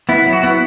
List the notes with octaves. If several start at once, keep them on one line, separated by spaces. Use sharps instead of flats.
B3 E4
F#3
F#4
B3 E4